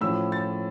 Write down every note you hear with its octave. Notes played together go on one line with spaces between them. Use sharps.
A2 F3 C#4 E6
A6